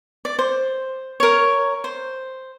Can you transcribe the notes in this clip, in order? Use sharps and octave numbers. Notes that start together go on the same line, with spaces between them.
D5
C5
A#4 C#5
C5